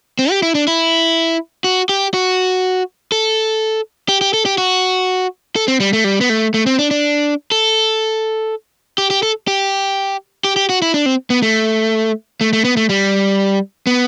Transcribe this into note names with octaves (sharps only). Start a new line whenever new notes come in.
C4
G4
E4
D4
E4
F#4
G4
F#4
A4
G4
G4
A4
G4
F#4
A4
C4
G3
A3
G3
B3
A3
A3
C4
D4
D4
A4
G4
G4
A4
G4
G4
G4
F#4
E4
D4
C4
B3
A3
A3
A3
B3
A3
G3
B3